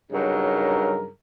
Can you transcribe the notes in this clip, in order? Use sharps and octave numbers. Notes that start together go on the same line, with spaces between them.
G2 C#3 F#3 D#4 A#4